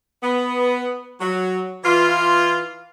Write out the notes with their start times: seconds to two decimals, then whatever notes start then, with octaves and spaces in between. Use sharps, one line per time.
0.22 B3
1.21 F#3
1.84 E3 F4